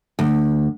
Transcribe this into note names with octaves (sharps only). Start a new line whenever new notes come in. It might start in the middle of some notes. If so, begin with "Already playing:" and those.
D2